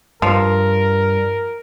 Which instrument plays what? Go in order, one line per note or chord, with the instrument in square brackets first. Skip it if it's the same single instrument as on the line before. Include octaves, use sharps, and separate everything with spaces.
[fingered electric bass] G2 [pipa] F3 [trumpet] A#4